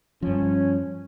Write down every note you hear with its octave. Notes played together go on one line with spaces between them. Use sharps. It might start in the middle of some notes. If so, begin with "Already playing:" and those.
G2 F3 C#4